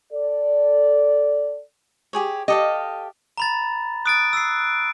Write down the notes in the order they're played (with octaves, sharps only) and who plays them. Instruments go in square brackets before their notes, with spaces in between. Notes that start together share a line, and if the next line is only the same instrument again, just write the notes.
[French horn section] A4 D5
[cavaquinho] G4 G#4 C#5
[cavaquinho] G4 A4 F5 [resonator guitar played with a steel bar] D#5
[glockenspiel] A#5 B5 A6
[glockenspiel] D#6 A6 [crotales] F#6 D7
[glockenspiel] E6 C7